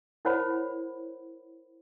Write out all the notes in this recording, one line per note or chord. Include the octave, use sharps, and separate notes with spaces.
E4 A#4 C5 C#5 F#5 B5